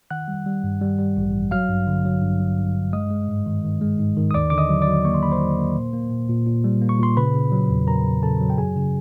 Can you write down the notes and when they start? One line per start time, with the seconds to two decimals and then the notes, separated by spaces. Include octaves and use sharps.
0.10 D#3 F#5 F#6
0.28 G3
0.46 G3
0.64 G2
0.82 G3
0.99 G3
1.17 A1
1.34 A1
1.51 F#3 F5 F6
1.69 G2
1.87 D3
2.05 F#3
2.22 G2
2.40 F#3
2.58 G2
2.75 G2
2.93 G#3 D#5 D#6
3.10 G#3
3.29 G#2
3.46 D#3
3.64 D#3
3.82 G#3
3.99 G#2
4.17 D#3
4.31 D#6
4.34 D#2 D5 D6
4.50 D3 D6
4.58 D#5 D#6
4.69 F#3
4.82 D5 D6
4.87 F#3
5.05 A#3 C#6
5.14 C6
5.23 A#3 B5
5.32 C5 C6
5.41 F#3
5.58 A#3
5.76 A#2
5.93 A#3
6.10 A#2
6.29 A#2
6.46 A#2
6.64 G3
6.82 A#3
6.89 C#6
6.99 A#2 C6
7.17 C#3 B4 B5
7.34 C#3
7.52 F#3
7.70 E2
7.87 F#3 A#4 A#5
8.05 C#3
8.23 C#3 A4 A5
8.40 F#3
8.50 G5
8.58 F#2 G#4 G#5
8.76 C#3